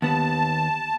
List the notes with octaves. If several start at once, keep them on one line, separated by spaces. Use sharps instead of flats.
D#2 B3 A5